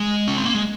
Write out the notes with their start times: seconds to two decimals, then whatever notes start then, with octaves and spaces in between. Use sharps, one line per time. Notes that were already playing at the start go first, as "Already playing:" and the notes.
Already playing: G#3
0.28 C#4
0.37 C4
0.45 A#3
0.54 G#3